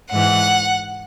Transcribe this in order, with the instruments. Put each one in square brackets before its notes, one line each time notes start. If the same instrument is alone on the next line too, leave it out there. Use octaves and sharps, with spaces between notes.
[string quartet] G#2 E3 F#5